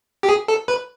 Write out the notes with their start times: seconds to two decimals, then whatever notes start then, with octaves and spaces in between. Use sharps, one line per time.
0.23 G4
0.29 G#4
0.48 A4
0.68 B4